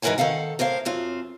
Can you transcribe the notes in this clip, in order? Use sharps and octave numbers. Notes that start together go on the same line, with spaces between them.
G#2 E3 A#4 B4 F#5 G#5
D#3 F3 A4 F5 F#5
A2 A#4 C5 F5
F#2 C4 F4